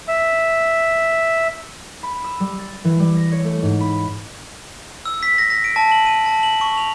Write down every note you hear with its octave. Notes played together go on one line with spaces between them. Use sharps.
E5
B5
E6
G3
A6
E3
G3
A#6
C#5
A3
G#2
B5
E6
B6
A#6
A#6
D7
A5
F#7
D#7
A5
F#7
C#6
F7